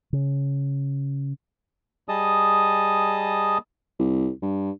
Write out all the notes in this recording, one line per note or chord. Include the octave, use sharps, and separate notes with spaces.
C#3
G3 G#4 D#5 A5 D#6
C2
G2